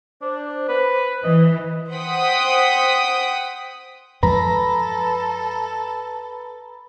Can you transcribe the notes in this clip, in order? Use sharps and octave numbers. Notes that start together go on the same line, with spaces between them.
D4 C5
B4
E3 B4 D#5
C5 F#5 G5 D#6 B6
F#2 F3 G#3 A4 B4 A#5 B5